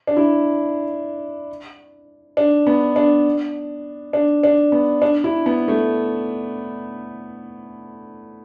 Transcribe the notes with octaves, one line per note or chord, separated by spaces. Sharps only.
D4
E4
D4
B3
D4
D4
D4
B3
D4
E4
B3
A3